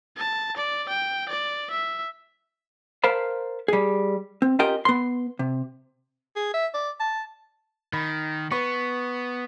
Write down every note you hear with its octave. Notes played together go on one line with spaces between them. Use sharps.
A5
D5
G5
D5
E5
A#4 C5 F5 A5 B5
G3 G#4
C4
C#4 F4 G4 A#4 D#5 G5
B3 C6
C3
G#4
E5
D5
A5
D#3 B5
B3 B4 C#6